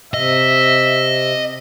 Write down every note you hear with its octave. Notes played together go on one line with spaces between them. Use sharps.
C3 D#5 E5